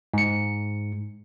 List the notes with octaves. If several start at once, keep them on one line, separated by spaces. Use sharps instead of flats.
G#2 C#7